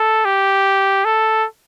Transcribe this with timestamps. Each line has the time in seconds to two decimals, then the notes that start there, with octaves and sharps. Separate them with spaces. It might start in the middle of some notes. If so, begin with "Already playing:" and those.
Already playing: A4
0.25 G4
1.05 A4